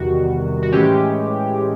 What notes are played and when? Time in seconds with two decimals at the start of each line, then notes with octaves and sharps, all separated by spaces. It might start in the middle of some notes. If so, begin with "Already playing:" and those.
Already playing: E2 C3 D#3 G3 F#4
0.63 F#4
0.72 A2 E3 G#3 C#4 G4